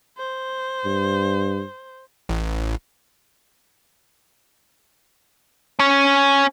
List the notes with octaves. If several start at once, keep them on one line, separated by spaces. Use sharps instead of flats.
C5
G2
A1
C#4 C#5